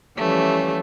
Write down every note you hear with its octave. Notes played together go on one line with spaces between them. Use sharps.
E3 F3 G3 A3 C#4